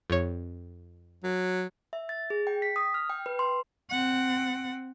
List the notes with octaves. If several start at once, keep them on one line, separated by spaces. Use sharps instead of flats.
F2 C#5
F#3
E5
A6
G#4
G5
B6
D#6
F6
G5
B4
C6
C4 F#5